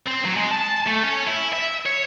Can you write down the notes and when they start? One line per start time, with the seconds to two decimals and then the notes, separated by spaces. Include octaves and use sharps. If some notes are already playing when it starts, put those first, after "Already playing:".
0.06 C4
0.25 F#3
0.36 G#3
0.51 A5
0.87 A3
1.03 C#4
1.27 E4
1.53 E5
1.86 C#5